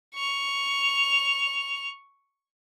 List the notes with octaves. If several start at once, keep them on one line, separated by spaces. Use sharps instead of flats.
C#6 F7